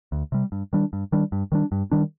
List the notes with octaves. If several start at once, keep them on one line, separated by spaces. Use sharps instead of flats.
D2
C3 G3
G2
D#3 G3 D4
G2
D#3 G3 D4
G2
D#3 G3 D4
G2
D#3 G3 D4